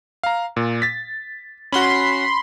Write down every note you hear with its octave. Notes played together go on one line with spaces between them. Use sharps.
F5 A#5
A#2
A6 B6
C#4 F#4 B5 C6